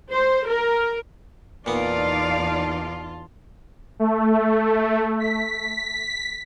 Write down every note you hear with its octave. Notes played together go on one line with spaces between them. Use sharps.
C5
A#4
E2 A#2 B3 D#4 F4 D5 F5 A5
A3
B6